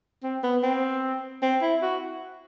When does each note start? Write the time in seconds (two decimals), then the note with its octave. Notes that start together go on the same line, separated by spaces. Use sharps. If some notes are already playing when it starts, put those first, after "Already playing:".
0.23 C4
0.43 B3
0.63 C4
1.42 C4
1.62 E4
1.82 F#4